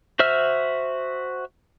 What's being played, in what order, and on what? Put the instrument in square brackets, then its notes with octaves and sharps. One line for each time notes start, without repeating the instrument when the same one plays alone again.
[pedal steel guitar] F#4 C5 E5 E6 F6